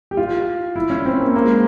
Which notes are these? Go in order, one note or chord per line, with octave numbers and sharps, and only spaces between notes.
G4
F4
E4
C#4
C4
A#3
A#3
G#3